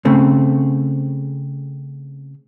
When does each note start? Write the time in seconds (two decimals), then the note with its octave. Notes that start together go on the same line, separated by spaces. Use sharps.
0.05 C#3 A3 C4